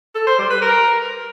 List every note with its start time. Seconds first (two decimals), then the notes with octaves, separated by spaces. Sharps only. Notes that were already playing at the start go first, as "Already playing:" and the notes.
0.15 A4
0.27 C5
0.38 G3
0.50 B4
0.62 A#4